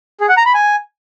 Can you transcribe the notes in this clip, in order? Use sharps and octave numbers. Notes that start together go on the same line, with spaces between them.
G#4
F#5
A#5
B5
G#5